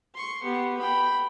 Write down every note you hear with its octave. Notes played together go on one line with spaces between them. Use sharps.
C6 C#6
B3 G4
G5 B5